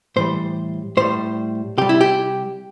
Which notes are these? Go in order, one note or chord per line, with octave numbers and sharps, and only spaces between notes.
A2 E3 G3 C5
A2 G3 C5
C3 G3 G4
E4
G4